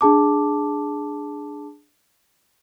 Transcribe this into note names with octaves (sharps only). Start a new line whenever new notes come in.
D4 G#4 A5 D6